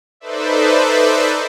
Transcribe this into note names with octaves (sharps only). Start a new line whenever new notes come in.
D#4 A4 B4 C5 D5 E5